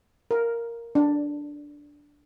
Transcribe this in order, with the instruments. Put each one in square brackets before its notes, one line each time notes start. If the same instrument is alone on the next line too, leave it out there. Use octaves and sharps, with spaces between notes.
[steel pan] A#4
D4